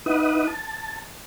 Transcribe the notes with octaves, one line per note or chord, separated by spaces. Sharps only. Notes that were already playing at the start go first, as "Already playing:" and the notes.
D#4 E4 B4 F#5 D#6
A5